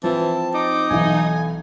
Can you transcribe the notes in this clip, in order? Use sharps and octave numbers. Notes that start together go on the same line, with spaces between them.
E3 F3 C4 A5
D#4 D6
B1 E3 G#5